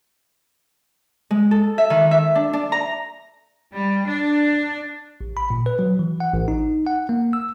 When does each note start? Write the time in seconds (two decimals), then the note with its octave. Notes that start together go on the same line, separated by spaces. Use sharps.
1.31 G#3
1.51 A4
1.78 E5
1.90 D#3
2.11 E5
2.35 D4
2.53 D4
2.72 A#5
3.74 G3
4.09 D4
5.21 A1
5.37 B5
5.50 A#2
5.66 B4
5.79 F#3
5.99 E3
6.20 F#5
6.34 A1
6.48 D#4
6.87 F#5
7.09 A#3
7.33 E6